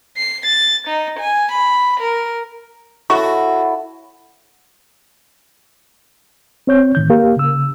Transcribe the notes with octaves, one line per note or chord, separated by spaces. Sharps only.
C7
A6
D#4
G#5
B5
A#4
E4 F#4 A4 C#5 C#6
C4 C#5 G6
A2 D#3 G6
A#3 G4 A#4 F5
C#3 E6